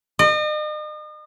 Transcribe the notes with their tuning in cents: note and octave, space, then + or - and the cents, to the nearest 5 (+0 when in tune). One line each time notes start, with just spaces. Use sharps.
D#5 -40